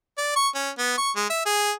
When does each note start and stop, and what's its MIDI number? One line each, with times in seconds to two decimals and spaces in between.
0.18 0.33 74
0.36 0.48 85
0.55 0.70 61
0.78 0.96 59
0.97 1.10 85
1.16 1.25 56
1.30 1.45 76
1.46 1.71 68